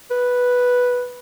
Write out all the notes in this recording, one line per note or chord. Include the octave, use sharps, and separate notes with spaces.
B4